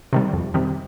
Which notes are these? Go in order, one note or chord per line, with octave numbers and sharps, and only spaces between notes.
C3 D#3 G3
F2
C3 D#3 G3